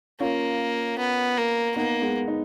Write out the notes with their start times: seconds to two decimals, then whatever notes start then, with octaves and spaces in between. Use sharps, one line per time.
0.20 A#3 C#4 F4
0.99 B3
1.38 A#3
1.76 A#3 B3 D#4
2.02 G#3 B3
2.28 B3 D#4